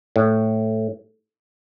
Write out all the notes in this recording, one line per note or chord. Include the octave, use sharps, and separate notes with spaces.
A2